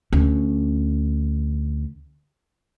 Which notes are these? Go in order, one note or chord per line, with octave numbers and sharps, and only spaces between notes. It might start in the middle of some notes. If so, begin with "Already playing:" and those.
D2 C#4